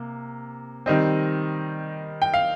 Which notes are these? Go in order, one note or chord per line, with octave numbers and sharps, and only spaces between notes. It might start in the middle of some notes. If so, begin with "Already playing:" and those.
Already playing: C3 A#3
D#3 G3 C4 D#5
G5
F5